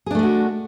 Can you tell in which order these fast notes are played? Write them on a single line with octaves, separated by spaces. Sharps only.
G#4 D4 A3 G#3 F#4